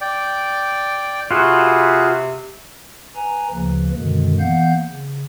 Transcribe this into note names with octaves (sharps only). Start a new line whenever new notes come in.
D5 G5
C3 F4 F#4 G#4 B4
B4 G#5 A#5
D2 C#3 F3 A#3 B4
F#2 B2 D3 D#3 G#3
E3 A#3 B3 F5 F#5 G6
C#3